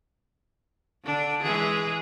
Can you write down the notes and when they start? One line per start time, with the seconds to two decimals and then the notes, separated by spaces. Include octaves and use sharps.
1.04 D3 D4
1.44 E3 G#3 G#4